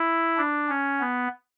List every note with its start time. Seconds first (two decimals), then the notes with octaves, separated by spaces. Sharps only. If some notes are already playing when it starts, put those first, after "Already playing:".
Already playing: E4
0.37 D4
0.69 C#4
1.00 B3